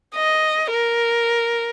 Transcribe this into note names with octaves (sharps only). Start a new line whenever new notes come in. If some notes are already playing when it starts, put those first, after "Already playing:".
D#5
A#4